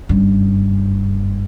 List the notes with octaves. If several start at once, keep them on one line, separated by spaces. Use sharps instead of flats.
F#1 G2